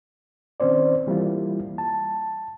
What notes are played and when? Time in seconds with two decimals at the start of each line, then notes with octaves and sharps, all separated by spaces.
0.60 D#3 C4 C#4 C5 D5
1.07 E3 G3 A#3 E4 F4
1.78 A5